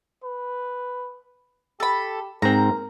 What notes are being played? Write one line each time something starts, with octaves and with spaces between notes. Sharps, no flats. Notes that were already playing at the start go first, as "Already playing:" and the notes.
B4
G4 A4 B5
G#2 C4 A#4 A#5